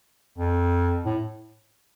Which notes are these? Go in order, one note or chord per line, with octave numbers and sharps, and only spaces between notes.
F2
A2